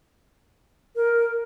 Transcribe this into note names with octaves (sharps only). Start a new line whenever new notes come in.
A#4